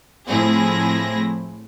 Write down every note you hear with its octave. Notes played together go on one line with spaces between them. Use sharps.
A2 F3 C4 E4 G#4 A#6